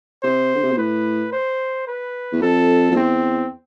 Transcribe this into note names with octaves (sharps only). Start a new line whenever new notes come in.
C3 C5
D3
C3
B2
A2 B4
C5
B4
E2
F2 A4
F2
E2 C4